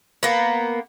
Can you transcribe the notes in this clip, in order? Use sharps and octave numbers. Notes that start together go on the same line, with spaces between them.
A#3 B3